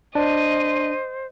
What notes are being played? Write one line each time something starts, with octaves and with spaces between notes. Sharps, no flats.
D4 C5 D#5 D#7